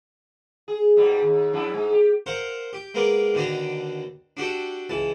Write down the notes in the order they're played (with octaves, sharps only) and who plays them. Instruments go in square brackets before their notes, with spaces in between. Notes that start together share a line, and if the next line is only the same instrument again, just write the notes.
[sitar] G#4
G#2 B2 G3
D#2
F2 D4 E4
G#2 G#3
G4
[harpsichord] A#4 C5 F5 F#5
G4
G#3 A#3 B3 A#4 D5
D#2 B2 D3 D4 D5 A#5
D4 F#4 G4 A4
C#2 E3 A5